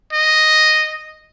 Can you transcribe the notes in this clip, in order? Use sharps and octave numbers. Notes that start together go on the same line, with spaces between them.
D#5